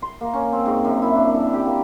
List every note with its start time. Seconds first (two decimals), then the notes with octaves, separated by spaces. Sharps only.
0.02 C6
0.21 A#3
0.34 C#4
0.53 C4
0.66 G#2
0.85 F#2
1.02 E4
1.15 D4
1.34 A4
1.53 G4
1.65 A#3